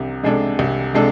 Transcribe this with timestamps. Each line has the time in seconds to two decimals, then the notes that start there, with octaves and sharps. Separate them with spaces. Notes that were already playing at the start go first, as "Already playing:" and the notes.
Already playing: C2 C3 D4
0.23 C3 G#3 D4 A4
0.59 C2
0.94 C3 G#3 D4 A4